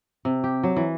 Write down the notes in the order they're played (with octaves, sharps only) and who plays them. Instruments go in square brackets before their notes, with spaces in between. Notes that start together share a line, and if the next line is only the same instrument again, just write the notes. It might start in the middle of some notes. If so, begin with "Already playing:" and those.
[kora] C3
G4
F#3
E3